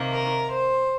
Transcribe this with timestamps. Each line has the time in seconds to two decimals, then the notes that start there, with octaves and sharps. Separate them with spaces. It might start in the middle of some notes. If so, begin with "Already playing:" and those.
Already playing: C3 D#3 A#3
0.10 A#4
0.50 C5